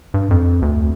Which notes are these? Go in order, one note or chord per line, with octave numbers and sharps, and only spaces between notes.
G2
F2
D2